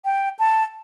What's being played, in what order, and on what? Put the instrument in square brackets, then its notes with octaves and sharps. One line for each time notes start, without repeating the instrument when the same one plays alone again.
[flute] G5
A5